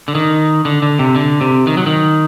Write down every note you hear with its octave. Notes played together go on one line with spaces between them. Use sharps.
D3
D#3
D3
D3
C3
D3
C3
D#3
F#3
D#3